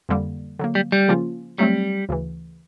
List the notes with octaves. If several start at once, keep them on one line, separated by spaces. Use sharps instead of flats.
F2 D3 G3 A#3
D3 F#3 A#3
G3
G3
C#3 F3 A#3 C#4 F4
F#3 G3 A3 C4
D2 C#3 E3